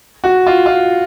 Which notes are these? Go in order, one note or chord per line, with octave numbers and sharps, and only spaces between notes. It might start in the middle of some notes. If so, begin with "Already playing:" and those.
F#4
F4
F4